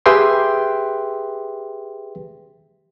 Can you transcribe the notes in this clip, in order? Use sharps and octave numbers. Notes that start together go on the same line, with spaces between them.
G4 G#4 B4 E5 G5 C6